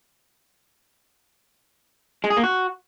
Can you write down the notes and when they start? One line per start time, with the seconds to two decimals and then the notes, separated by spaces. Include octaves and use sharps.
2.24 G#3
2.30 G#4
2.37 A#3
2.43 F#4